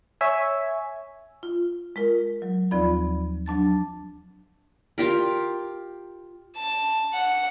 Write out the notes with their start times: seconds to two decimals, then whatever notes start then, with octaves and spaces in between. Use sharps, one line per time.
0.21 C#5 E5 G#5
1.43 F4
1.96 G#3 F4 A#4
2.42 F#3
2.71 D#2 F3 C4 F4 D5 B5
3.46 F#3 D4 A5 A6
4.98 F4 G4 A#4
6.57 A5
7.13 F#5